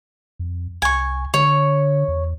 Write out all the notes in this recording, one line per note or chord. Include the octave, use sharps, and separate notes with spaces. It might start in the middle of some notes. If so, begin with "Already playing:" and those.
F2
C2 G#5 C#6
D3 C#5
E2